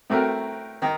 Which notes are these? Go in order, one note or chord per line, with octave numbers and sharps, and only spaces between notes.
A2 A3 C4 F#4 A#4
D#3